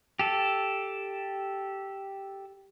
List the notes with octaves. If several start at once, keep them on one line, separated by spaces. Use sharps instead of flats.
G4 A4